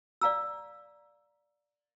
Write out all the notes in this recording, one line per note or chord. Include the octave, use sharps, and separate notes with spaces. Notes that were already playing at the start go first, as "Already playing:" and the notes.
D5 F5 A#5 E6